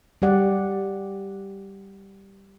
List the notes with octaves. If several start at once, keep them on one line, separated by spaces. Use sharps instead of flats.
G3 G4 D5 F#5